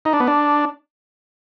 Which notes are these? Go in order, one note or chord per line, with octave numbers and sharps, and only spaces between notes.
D#4
D4
B3
D4